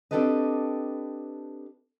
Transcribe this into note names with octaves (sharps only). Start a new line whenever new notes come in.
C4 D4 G4 A4 B4 D#5